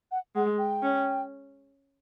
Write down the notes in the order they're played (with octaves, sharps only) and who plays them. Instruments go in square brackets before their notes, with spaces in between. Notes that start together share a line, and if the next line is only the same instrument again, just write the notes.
[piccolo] F#5
[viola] G#3 [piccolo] F#5
[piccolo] G5
[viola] C#4